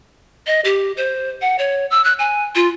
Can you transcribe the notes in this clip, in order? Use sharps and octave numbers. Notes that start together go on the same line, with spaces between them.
D#5
G4
C5
F#5
C#5
E6
F#6
G#5
F4